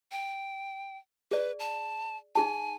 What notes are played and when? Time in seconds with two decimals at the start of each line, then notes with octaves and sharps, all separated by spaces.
0.12 G5
1.31 G#4 B4 D5
1.59 A5
2.35 D#4 G#4 G#5 A5